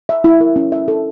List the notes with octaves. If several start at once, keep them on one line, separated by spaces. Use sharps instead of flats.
E5
E4
A#4
C#4
E5
A4